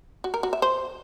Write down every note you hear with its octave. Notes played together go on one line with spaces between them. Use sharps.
F#4
A#4
F#4
E5
C5